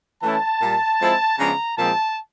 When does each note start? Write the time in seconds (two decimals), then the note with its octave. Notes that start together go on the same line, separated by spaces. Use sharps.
0.23 E3 A3 C#4 E4 A5
0.62 A#2 G3 A#3
1.01 F3 G#3 C4 E4
1.39 C#3 F3 G#3 B3 D4 A#5
1.78 A#2 F3 G#3 C4 A5